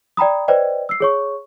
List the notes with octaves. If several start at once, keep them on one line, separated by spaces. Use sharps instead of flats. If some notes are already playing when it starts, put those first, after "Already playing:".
D5 G5 A#5 B5 D#6
B4 C5 D5 D#5 G5
E6 C7
G#4 C#5 C#6